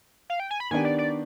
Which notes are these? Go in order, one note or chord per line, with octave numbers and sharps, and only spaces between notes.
F5
G5
G#5
B5
D#3 B3 D4 G4 G#5
D5
D5